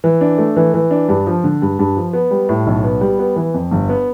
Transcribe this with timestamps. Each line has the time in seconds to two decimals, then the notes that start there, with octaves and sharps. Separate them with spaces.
0.04 E3
0.21 D4
0.38 A3
0.56 E3
0.74 E3
0.91 D4
1.09 G2
1.26 F3
1.44 D3
1.62 G2
1.79 G2
1.97 F3
2.13 B3
2.31 G3
2.49 A2
2.67 B1
2.84 B3
3.01 G3
3.19 B3
3.36 E3
3.54 F2
3.71 G1
3.89 B3